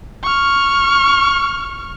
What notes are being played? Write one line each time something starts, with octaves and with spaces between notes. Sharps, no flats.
C#6 F6